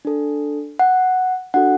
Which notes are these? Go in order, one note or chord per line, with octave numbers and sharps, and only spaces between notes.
D4 A4
F#5
D4 F#4 A4 F#5